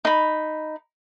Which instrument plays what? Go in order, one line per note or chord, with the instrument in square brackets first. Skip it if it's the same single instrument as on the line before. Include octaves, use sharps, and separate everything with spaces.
[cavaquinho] D#4 B5